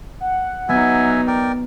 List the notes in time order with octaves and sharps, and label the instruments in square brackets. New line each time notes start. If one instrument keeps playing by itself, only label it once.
[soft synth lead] F#5
[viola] F#3 D#4 [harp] B3 [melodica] E5 G#5
[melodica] A#4 D5 G5